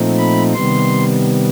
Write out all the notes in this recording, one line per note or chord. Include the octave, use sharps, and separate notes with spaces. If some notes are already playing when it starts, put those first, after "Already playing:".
Already playing: A#2 F3 A3 C4 D#4
B5
C3 D#3 G3 B3 C6